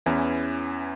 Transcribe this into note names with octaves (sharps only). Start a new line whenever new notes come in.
E2 E3 C#4 E4